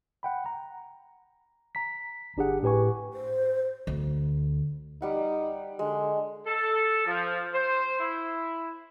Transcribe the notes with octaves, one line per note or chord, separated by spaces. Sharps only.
F#5 G5 B5
A#5
A#5 B6
G1 D4 G4 G#4 F#5
A2 G4 B4 G#5 C#6
C5
D2
G3 D#4 F#5
D3 G#3
A4
F3
C5
E4